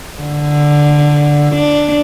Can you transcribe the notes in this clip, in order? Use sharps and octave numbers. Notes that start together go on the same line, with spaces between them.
D3
D4